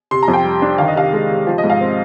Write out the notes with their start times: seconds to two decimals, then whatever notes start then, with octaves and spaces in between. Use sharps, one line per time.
0.11 C3 C6
0.23 A#5
0.28 F2
0.33 G5
0.44 G3
0.62 D4
0.78 D#3 F5
0.88 D#5
0.95 C3 F5
1.13 G#3
1.30 C3
1.47 F3
1.58 D#5
1.64 G#2
1.70 F5
1.81 C4